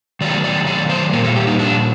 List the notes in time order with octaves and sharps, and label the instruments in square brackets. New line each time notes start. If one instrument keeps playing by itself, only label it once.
[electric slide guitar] D#3 F#3 A3 D5
D5
D5
C5
A#2 G3 A#3 A#4
A4
G4
D#4
D4